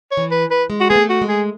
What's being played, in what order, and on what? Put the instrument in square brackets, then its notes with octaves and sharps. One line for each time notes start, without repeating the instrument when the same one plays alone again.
[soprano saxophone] C#5
[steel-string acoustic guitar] E3
[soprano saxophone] B4
B4
[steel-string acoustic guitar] G#3
[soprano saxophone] F#4
[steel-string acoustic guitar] B3 [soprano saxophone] G#4
[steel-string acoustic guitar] A3
[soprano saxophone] F#4
[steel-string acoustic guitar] G#3
[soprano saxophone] G#4